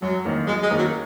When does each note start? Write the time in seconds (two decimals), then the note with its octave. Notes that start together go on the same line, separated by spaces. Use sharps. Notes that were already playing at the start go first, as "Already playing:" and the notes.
0.02 F#2 F#3
0.25 D#3 A#3 C#4 A#4
0.47 F#2 G#3
0.63 G#3
0.70 D#3 A#3 C#4 A#4
0.78 F#3